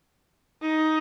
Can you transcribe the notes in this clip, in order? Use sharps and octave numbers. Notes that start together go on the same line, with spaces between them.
D#4